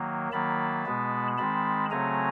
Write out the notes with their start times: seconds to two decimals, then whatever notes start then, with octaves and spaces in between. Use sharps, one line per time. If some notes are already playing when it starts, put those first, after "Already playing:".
Already playing: D#3 F#3 A#3
0.32 D#3 F#3 A#3 A5 B5
0.86 B2 G#3 B3
1.38 D#3 G#3 C4 A5 B5
1.91 C#3 F#3 A3 C4 G#5 A#5